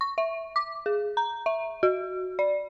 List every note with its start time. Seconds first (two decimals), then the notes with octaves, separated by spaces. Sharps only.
0.01 C#6
0.18 E5
0.56 D6
0.86 G#4
1.17 A#5
1.46 E5
1.83 F#4
2.39 D5